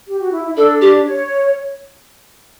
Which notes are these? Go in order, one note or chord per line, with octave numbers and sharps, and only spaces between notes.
G4
F#4
E4
E4
D4 A4
G4
C#5